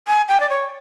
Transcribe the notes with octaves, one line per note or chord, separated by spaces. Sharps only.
G#5
G5
D5
C#5